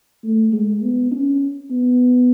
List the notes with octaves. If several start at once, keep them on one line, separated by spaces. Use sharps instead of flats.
A3
G#3
B3
C#4
B3